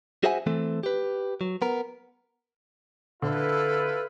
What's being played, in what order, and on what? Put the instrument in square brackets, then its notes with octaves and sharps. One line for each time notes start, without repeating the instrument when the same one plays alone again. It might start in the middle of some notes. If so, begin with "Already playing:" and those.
[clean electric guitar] F#4 G#4 C5 E5 F#5 G#5
E3 A3 C4 A4
G4 B4
F#3
B3 A#4
[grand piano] D3 [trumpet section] E4 F4 B4 [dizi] A4